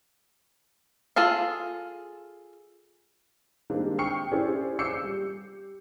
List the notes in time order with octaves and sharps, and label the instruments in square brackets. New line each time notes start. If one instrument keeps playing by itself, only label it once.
[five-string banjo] F4 G#4 A4 F5
[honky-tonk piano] D#3 G3 G#3 A#3 C4 D4
G5 C#6 F6 C7 C#7
C#4 E4 G4 G#4 C5 D5
D6 E6 G6 C7 C#7
G3